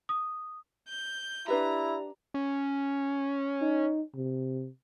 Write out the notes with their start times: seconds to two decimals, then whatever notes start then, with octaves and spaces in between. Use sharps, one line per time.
0.09 D#6
0.89 G6
1.48 D4 E4 G4 B4 D5 E5 A#5
2.34 C#4
3.61 D#4
4.15 C3